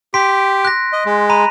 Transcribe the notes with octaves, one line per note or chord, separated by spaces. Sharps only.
G4 C6 B6 D7
F#6 A#6
D#5
G#3
A#5 B5 D#7